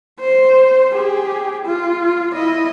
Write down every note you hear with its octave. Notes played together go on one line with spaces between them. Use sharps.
C5
G4 G#4
F4
E4 D#5